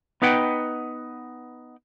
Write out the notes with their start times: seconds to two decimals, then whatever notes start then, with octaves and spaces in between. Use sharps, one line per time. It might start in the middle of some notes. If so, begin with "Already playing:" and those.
0.22 B3 D#4 B4 F#5 G5